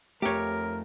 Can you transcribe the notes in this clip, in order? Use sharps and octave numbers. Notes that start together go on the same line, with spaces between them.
F2 A3 G4 A#4 C#5